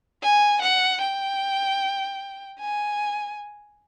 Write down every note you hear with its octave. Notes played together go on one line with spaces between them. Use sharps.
G#5
F#5
G5
G#5